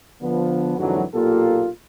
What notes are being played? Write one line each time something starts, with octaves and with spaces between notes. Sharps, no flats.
D3 F3 B3
F2 G#2 D3 E3 F#3
B1 A#2 A#3 F4 G4 A4